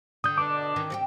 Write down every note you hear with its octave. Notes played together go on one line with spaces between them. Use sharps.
D3 D#6 G6
B2 D4 D6
D#3 C#4
C4 F#4 G4